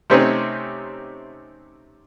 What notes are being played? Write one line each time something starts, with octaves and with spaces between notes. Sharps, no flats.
C3 A3 C4 C#4 D#4